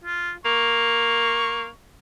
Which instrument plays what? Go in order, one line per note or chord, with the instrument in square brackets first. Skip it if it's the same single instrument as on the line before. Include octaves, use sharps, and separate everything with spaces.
[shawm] F4
[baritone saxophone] A#3 [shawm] C#6